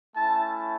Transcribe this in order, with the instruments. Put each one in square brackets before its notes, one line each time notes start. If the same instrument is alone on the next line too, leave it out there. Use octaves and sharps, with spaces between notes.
[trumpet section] A3 C#4 E4 A5